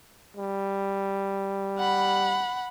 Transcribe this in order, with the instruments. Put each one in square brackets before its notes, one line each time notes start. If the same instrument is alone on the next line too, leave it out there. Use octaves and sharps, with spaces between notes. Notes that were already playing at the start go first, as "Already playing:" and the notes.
[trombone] G3
[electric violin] F#5 B5